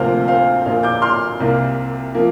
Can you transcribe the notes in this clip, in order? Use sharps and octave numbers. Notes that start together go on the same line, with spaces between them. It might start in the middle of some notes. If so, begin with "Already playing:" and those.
Already playing: D2 C3 F3 A#3 C5 F5
C5 F5
A#1 A#2 A#3 C5 F5
D6 G6
C6 F6
C2 C3 A#3
F3 A#3